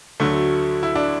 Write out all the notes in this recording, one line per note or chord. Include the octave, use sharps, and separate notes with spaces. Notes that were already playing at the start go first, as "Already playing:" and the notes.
D2 D3 F#3 A3
E4
D4